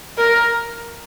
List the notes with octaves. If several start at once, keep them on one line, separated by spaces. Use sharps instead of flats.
A#4